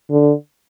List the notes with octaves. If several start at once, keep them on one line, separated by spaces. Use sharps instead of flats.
D3